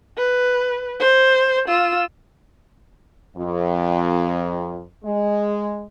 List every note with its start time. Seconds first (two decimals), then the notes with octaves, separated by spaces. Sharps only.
0.17 B4
1.00 C5
1.68 F4 E6
3.36 F2
5.04 G#3